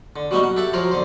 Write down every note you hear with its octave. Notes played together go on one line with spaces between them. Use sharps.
D3
F#3 G3 B3 C#4 D#4 F#4
F#4
G4 A4 E5 F#5
F3 F#3 A#4 C5 C#5
B1 D3 C5